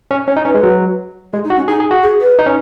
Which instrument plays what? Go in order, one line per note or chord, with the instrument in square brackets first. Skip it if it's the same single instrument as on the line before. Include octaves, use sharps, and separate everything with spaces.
[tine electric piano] C#4
[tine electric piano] C#4 [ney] C#5
[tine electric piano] D#4
[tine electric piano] C#4 [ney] B4
[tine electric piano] G#3
F#3
[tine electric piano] G#3 [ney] G#4
[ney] D#4
[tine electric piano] F#4
[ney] C#4
[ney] D#4 [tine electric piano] G#4
[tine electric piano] G#4
F#4
[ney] G#4
B4
[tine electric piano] D#4
C#4